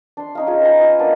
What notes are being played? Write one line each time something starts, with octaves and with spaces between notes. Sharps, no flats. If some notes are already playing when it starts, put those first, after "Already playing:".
D4 C6
C#4 D#4 F5
F4 G#4 C#5 F5
B4 G5 A#5
D#5 F5 G#5
A#3 B3 D4 D5